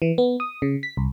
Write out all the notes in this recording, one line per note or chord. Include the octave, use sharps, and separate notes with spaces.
E3
B3
D#6
C#3
B6
C2